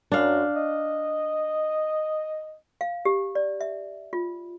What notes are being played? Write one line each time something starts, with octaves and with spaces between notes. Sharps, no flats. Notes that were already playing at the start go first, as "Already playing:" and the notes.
F#2 D4 F5
D#5
F5
G4
D5
E5
F4